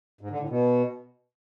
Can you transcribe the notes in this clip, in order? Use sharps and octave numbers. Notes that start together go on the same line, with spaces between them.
G#2
D3
A2
B2